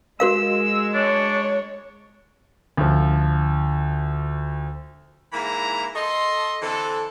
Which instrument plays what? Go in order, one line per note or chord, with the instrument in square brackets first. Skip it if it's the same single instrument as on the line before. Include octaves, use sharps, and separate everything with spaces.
[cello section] G#3 [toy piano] F#4 A#4 F5 [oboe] E6
[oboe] D4 [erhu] C#5
[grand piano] D2 F3
[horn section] G#2 E3 A#3 E4 A#5
A4 D#5 C6
D3 E3 C4 A4